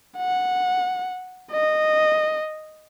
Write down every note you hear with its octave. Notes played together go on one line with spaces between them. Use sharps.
F#5
D#5